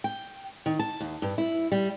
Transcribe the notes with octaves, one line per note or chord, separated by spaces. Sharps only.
G5
D#3
A5
D#2
G2
E4
G3